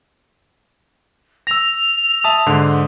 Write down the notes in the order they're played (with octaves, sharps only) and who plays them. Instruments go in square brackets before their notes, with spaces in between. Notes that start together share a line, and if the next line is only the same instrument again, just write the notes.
[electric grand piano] E6 A#6 [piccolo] F7
[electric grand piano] E5 A5 D#6
G#2 D3